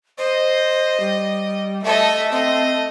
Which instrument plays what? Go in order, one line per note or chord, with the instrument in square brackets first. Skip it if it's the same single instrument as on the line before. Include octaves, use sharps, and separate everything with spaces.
[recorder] C5 [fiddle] D#5
[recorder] G3
[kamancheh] A3 [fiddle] A4 D#5 [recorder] E5
[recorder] C4 [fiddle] D#5